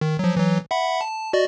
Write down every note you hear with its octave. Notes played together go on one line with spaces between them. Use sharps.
D#3
F3 F#3
E3 F#3
E5 F#5 B5
A5
F#4 D5 D#5